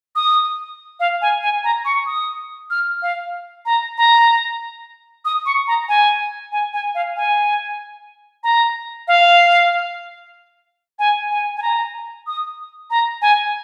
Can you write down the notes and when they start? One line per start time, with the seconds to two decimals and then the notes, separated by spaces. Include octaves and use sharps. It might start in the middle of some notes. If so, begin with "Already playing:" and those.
0.16 D#6
1.00 F5
1.22 G#5
1.42 G#5
1.64 A#5
1.85 C#6
2.06 D#6
2.70 F6
3.02 F5
3.66 A#5
3.98 A#5
5.25 D#6
5.46 C#6
5.67 A#5
5.89 G#5
6.52 G#5
6.73 G#5
6.95 F5
7.16 G#5
8.44 A#5
9.08 F5
10.99 G#5
11.30 G#5
11.57 G#5
11.62 A#5
12.27 D#6
12.90 A#5
13.22 G#5